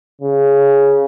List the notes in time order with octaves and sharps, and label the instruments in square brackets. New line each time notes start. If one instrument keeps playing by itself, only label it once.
[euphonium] C#3